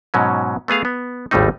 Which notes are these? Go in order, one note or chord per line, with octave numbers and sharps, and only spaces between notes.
G#2 B2 F#3 C#4
A3 B3 G#4 F5
B3
G#1 D#2 A2 G3 A3 D#4